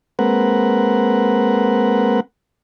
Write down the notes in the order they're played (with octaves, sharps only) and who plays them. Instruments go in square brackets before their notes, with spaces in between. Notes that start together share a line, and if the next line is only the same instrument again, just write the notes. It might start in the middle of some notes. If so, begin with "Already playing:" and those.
[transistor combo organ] G#3 A#3 C4 A#4 B4 F#5